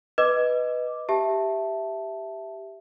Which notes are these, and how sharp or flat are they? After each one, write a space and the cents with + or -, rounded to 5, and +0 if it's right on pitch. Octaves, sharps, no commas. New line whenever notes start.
B4 +0 D#5 +0 D6 +0
G4 +0 E5 +0 A5 +0